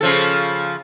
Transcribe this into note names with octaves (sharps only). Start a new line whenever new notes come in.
C#3 F3 A4